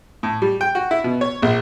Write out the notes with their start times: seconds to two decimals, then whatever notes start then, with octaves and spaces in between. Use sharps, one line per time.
0.23 A2
0.42 G3
0.61 G5
0.75 F#4
0.91 E4
1.04 B2
1.21 C#5
1.42 A#1